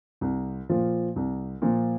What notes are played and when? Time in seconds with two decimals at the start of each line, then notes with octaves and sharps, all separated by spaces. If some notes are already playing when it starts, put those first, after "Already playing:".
0.21 C2
0.69 A#2 F3
1.16 C2
1.62 A#2 F3